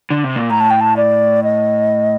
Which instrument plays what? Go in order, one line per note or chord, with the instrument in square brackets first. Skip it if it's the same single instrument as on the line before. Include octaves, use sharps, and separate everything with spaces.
[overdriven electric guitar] D3
C3
A#2
[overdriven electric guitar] A2 [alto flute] A#5
[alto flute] A5
G5
A5
D5
D#5